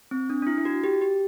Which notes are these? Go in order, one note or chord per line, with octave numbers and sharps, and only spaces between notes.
C4
D4
D4
E4
E4
F#4
G4
G4